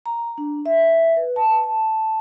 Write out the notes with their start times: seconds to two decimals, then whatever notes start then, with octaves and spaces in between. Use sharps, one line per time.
0.06 A#5
0.38 D4
0.66 E5
1.17 B4
1.36 A5
1.64 A5